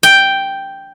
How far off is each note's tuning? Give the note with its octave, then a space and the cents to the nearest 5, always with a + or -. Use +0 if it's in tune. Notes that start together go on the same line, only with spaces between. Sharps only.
G5 +0